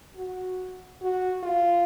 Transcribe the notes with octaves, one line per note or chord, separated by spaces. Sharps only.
F#4
F#4
F4